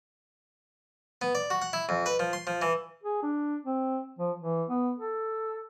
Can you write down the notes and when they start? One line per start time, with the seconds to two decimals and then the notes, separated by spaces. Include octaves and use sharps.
1.22 B3
1.35 D5
1.50 F#4
1.62 F#5
1.73 E4
1.89 F2
2.06 B4
2.19 F3
2.33 C6
2.47 F3
2.62 E3
3.03 G#4
3.23 D4
3.66 C4
4.19 F3
4.39 E3
4.69 B3
4.98 A4